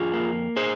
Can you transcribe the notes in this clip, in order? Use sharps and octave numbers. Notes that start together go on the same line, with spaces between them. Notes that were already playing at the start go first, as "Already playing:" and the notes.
Already playing: F2 F4 G#4
A#3
G#4 C5